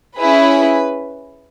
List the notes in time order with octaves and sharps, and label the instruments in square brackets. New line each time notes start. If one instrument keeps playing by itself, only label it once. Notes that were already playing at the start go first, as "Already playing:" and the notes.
[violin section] C#4 E4 G#4 B4